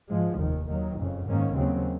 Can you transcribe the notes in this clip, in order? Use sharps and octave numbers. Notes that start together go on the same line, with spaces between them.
G#2 F3 G#3
F1 D#2 D#3
D#2 D#3 F#3
F#1 F2 C#3
G#2 D#3 A#3 C#4
D#2 C#3 F#3 C4